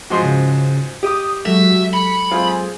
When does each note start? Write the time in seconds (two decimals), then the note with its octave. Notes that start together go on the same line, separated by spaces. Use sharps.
0.10 G#2 F3 F#4 C6
0.23 C#3
1.03 G4 D6 D#6
1.45 F#3 G#3 F#4 A4 E5
1.93 B5 C#7
2.31 C4 F4 G#4 F5